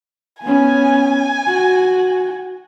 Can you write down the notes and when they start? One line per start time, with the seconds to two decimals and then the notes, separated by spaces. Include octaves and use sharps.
0.42 B3 C#4 G#5
1.47 F#4